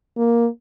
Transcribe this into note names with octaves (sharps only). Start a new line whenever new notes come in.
A#3